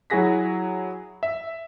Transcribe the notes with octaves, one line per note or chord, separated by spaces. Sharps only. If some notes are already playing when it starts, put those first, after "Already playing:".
F#3 E4 F#4 G#4 A#6 B6
E5